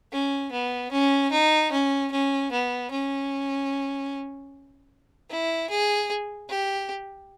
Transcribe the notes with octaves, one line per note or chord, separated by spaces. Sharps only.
C#4
B3
C#4
D#4
C#4
C#4
B3
C#4
E4
G#4
G4